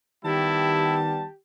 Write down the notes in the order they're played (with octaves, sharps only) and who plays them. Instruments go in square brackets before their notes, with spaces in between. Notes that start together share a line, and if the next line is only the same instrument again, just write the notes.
[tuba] D#3 [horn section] G3 B3 A5 [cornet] E4 [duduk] G4